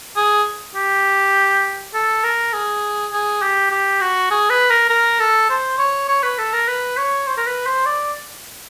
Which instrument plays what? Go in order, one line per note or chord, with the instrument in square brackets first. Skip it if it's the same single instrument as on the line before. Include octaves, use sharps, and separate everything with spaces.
[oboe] G#4
G4
A4
A#4
G#4
G#4
G4
G4
F#4
G#4
B4
A#4
A#4
A4
C5
C#5
C#5
B4
A4
A#4
B4
C#5
C5
A#4
B4
C5
D5